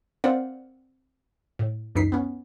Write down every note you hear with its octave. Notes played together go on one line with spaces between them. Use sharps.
C4 A#4 C5 D5 F5 F#5
A2
C#2 F#2 E3 D#4 B6 C7
B3 C#4